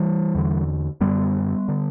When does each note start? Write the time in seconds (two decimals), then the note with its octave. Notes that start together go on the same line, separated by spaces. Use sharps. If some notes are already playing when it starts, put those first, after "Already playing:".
Already playing: E3 G3
0.35 E2 D3
1.01 F#2 D3 G3 B3
1.68 D3